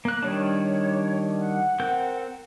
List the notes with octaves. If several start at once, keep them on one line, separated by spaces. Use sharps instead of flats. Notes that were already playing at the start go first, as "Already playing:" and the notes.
A#3 F#6
D#3 G3 D4 C#5
F#5
C4 A#4 G6